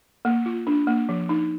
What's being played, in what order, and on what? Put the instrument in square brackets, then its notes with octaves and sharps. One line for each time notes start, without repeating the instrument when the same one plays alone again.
[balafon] A#3
F4
D4
A#3
F3
D#4